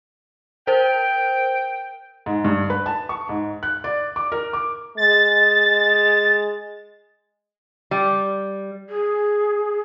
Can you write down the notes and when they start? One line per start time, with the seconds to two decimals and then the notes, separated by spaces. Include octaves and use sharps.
0.67 A#4 C5 G5
2.26 G#2
2.44 G2
2.70 B4
2.86 A5
3.09 C#6
3.29 G#2
3.63 F#6
3.84 D5
4.16 D6
4.32 A#4
4.53 D6
4.97 G#3 A6
7.91 G3
8.89 G#4